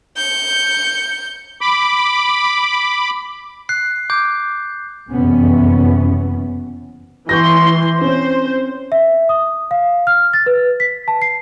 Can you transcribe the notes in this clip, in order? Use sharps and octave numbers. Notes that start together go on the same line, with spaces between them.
G6 C#7
B5 D6
F#6 C7
D6 G6
F#1 F2 C3 E3 B3 C#4
E3 C6 C#6 G6 A#6
C4 C#4 C5
E5
D#6
F5
F6
A6
B4
B6
A5
C7